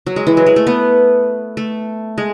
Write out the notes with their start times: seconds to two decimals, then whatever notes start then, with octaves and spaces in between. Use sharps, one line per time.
0.06 F#3
0.16 G#3
0.27 E3
0.37 F#3
0.46 G#3
0.56 A3
0.67 B3
1.57 A3
2.18 G#3